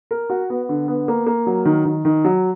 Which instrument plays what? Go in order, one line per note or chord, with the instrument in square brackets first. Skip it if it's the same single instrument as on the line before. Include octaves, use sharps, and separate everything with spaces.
[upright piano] A#4
F#4
B3
D3
B3
A#3
A#3
F#3
D#3
D#3
D#3
F#3